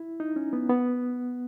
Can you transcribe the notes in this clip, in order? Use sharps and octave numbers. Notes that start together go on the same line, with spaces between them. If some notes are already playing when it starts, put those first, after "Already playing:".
Already playing: E4
D#4
C#4
B3
B3